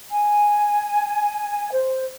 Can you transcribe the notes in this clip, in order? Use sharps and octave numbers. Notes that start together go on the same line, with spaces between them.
G#5
C5